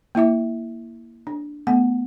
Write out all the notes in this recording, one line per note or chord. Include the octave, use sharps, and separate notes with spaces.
A#3 E4 E5 D6
D4
A3 B3 F#5